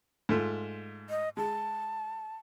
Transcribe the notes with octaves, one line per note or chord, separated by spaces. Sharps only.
G#2 A3 F4
D#5
G#3 A5